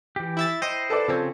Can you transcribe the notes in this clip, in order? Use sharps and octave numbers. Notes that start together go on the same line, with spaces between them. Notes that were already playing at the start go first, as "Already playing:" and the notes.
E3 G4
E4 E5 A6
E4 C5 D#5 G5
A4 B4 D5
C#3 F3 C4 A4 G#5 C#6